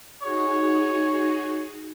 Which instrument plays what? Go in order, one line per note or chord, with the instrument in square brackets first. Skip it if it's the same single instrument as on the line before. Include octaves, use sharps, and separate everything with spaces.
[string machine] D#4 F#4 G#4 [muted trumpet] C#5